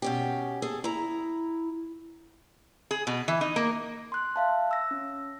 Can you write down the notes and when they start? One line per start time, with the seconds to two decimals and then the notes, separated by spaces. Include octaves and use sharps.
0.02 B2 C#4 G4
0.62 G#4 A4
0.84 E4 A#5
2.91 G#4
3.07 B2
3.28 E3
3.41 D#4
3.56 A#3
4.12 C6 F#6
4.36 E5 F5 A5
4.71 E6 A#6
4.91 C#4